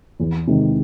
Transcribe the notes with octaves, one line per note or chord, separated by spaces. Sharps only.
E2
C3 D#3 G#3